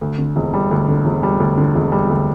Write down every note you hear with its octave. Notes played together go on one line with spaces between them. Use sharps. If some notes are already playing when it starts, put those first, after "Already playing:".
D2
D3
E1
G3
D2
D3
E1
G3
D2
D3
E1
G3
D2